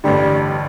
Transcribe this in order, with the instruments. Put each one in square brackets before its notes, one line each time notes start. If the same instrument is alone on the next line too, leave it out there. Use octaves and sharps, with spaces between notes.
[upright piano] A1 G2 D3 [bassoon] G3